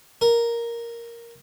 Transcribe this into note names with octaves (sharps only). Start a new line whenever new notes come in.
A#4